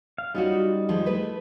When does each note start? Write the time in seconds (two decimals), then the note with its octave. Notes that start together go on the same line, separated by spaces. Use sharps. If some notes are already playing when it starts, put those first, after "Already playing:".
0.18 F5
0.35 G3 C#4 D#4 F4 F#4
0.89 D#3 F3 G#3
1.06 A3 E4 B4